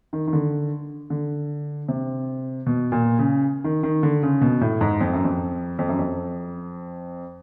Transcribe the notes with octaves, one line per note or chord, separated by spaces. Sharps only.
D#3
D#3
D3
D3
C3
B2
A#2
C#3
D#3
D#3
D3
C#3
B2
A2
G#2
F2
F#2
F2
F2
F#2
F2